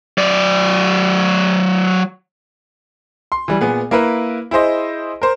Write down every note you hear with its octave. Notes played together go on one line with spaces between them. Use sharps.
F#3 D5
C6
E3 G3
A#2 B3 G#4
A#3 E4 A#4 B4
E4 G#4 C5 D#5
A#4 C5